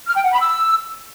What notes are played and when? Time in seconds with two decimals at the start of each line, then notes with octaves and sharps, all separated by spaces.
0.07 F6
0.15 G5
0.24 F#5
0.33 B5
0.41 E6